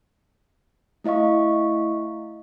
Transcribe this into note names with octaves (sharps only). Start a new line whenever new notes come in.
A3 E4 D#5 F5 C#6